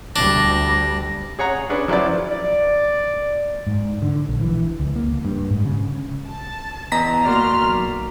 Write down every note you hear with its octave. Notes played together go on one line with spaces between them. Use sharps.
D2 G3 D4 A#6
G#4 C#5 F#5 A#5
C#4 D4 G#4 B4
F3 F#3 E4 B4 D5
D5
G#2
D3
A#1
E3
C#2
A#3
G2
G#2
C#3
A5
E2 B3 D#5 A#5 B6
A#3 F#4 D5 C6 F6
B1